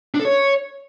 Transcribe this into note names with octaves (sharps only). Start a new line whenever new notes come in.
D4
A4
C#5